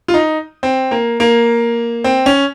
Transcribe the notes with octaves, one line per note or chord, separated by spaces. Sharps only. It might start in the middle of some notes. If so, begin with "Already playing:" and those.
F4
D#4
C4
A#3
A#3
C4
C#4